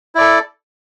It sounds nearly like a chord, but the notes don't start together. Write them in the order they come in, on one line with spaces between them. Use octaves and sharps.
E4 D5 A4